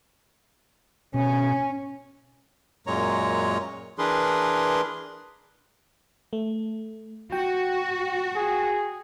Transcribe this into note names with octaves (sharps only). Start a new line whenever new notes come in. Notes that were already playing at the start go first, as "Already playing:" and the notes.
B2 C#4
F#2 A#2 G#3 C#5 A#5
E3 D4 G#4 A#4 B4 C6
A3
F#4 G5
G#4